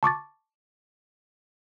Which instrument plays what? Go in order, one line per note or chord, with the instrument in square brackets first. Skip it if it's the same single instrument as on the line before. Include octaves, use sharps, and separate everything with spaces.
[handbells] A5 C#6 D6 A6